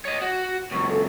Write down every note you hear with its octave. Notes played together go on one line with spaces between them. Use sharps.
C#5 D#5
F#4
C#2 F#2 C#6
A4